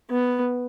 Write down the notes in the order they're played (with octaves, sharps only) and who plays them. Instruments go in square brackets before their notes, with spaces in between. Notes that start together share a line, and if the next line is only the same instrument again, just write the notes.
[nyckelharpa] B3